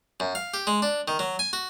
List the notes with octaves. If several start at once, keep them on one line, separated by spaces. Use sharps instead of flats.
F#2
F5
G4
G#3
D4
D#3
F#3
G#5
F#4